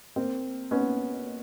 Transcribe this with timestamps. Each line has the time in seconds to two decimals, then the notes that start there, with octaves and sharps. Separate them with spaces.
0.16 A#3 C4
0.71 B3 C#4